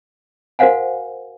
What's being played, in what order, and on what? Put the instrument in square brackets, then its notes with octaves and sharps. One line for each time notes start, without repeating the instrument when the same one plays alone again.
[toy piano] F#4 A#4 C5 F5 F#5 G#5